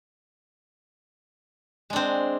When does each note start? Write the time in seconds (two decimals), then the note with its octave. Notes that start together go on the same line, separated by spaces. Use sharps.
1.90 G#3
1.93 D4
1.96 C4